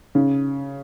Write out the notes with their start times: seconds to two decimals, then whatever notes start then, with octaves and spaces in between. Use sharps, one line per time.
0.15 C#3